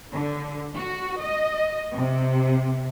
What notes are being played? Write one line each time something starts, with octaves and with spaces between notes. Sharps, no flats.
D3
F#4
D#5
C3